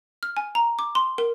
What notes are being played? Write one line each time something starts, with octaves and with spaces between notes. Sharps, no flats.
F6
G#5
A#5
D6
C6
A#4